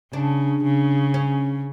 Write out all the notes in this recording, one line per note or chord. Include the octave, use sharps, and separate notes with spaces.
C#3 D4
C#3
C#4